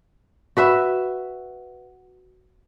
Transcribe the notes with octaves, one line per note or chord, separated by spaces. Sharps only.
F#4 B4 E5